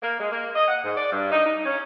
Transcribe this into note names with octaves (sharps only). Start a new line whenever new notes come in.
A#3
G#3
A#3
D#5
F#5
G#2
D5
G2
D#4
D#4
C#4